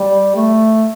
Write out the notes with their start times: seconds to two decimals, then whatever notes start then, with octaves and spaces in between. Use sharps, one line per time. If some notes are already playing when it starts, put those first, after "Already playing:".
Already playing: G3
0.36 A3